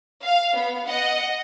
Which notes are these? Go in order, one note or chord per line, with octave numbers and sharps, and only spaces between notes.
F5
B3
D#5 F#5